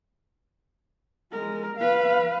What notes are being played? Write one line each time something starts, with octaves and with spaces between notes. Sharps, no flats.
G#3 A#4
B4 F5